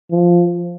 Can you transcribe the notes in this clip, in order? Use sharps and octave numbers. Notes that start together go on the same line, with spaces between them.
F3